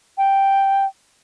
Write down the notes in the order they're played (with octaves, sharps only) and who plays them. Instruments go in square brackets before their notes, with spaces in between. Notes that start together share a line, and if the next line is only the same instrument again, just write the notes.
[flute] G5